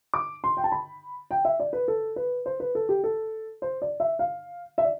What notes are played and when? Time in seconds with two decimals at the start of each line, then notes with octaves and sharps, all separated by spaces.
0.14 D6
0.44 C6
0.57 G5
0.64 A5
0.72 B5
1.31 G5
1.45 E5
1.60 D5
1.73 B4
1.88 A4
2.16 B4
2.46 C5
2.60 B4
2.75 A4
2.89 G4
3.04 A4
3.62 C5
3.82 D5
4.00 E5
4.19 F5
4.78 E5
4.84 D5